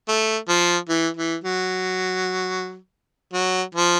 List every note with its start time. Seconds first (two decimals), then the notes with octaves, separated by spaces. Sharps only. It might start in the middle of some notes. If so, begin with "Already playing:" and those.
0.09 A3
0.49 F3
0.89 E3
1.17 E3
1.44 F#3
3.34 F#3
3.75 F3